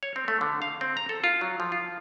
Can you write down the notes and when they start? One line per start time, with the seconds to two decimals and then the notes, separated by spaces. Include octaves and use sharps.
0.03 C#5
0.16 C4
0.28 A3
0.41 D3
0.62 F5
0.81 C4
0.97 A#5
1.09 A4
1.24 F4
1.41 F#3
1.60 F3
1.72 F4